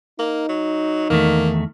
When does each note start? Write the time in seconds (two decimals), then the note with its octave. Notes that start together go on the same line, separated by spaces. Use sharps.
0.19 A#3 D#4
0.49 F#3
1.10 E2 D#3 A3 A#3